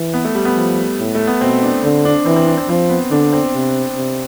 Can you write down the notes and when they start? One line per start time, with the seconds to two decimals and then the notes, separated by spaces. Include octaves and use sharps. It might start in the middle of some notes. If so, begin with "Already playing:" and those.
Already playing: E3
0.14 B3
0.25 A3
0.35 G3
0.45 B3
0.56 F3
0.99 A2
1.15 A3
1.27 B3
1.41 B2 C4
1.63 D4
1.84 D3 C4
2.05 D4
2.26 E3 C4
2.36 C4
2.47 D4
2.58 C4
2.69 F3 C4
2.89 B3
3.11 D3 D4
3.33 C4
3.54 C3
3.96 C3